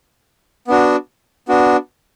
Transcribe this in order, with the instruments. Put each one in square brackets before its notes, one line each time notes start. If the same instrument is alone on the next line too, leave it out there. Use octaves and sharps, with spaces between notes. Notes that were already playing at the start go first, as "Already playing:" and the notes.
[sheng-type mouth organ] B3 D4 F#4
B3 D4 F#4